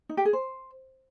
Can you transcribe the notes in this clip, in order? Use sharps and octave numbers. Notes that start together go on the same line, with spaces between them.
D#4
G4
G#4
C5